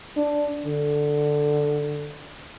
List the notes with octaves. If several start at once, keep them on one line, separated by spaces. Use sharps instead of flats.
D4
D3